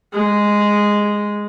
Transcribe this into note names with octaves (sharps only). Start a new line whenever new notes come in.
G#3